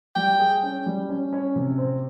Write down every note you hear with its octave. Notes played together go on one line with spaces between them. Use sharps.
G3 G5
G#4
C#4
G3
C#4
C#4
C3
C4